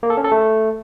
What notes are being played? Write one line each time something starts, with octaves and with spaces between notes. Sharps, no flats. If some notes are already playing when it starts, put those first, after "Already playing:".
A#3
A4
C#4
A4
A3